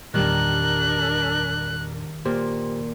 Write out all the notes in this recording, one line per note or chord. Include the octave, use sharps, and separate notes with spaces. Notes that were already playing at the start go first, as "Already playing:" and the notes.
E2 A#2 D#3 G3 D4 A#4 F#6
A#2 G4 C5